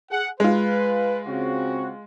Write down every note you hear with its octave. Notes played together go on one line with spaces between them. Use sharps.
G#4 F#5
G#3 F4 B4
C#3 C4 F#4